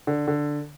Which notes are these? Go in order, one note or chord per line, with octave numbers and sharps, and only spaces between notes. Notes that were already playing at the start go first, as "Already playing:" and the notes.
D3
D3